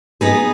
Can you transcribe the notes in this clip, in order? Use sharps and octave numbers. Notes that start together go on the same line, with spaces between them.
B3 D#4 G#4 B4